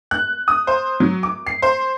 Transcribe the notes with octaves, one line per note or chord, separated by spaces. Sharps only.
F#6
D#6
C5
F#3
D6
C7
C5